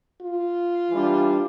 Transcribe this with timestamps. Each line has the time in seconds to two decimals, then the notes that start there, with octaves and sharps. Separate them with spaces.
0.23 F4
0.90 E3 G3 D4